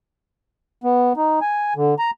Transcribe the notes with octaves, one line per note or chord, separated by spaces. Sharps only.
B3
D#4
G#5
D3
A#5